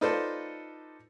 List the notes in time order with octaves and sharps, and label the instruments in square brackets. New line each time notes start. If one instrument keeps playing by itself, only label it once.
[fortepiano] D#4 F4 A4 B4 C5 D5